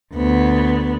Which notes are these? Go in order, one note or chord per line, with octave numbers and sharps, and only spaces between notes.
D2 B3